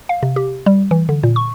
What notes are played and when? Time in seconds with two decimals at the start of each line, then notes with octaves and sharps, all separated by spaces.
0.09 F5
0.23 C3
0.36 G4
0.66 G3
0.91 E3
1.09 D3
1.23 A#2
1.36 C#6